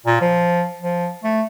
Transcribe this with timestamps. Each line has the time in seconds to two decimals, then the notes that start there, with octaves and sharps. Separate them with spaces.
0.06 A#2
0.21 F3
0.82 F3
1.24 A3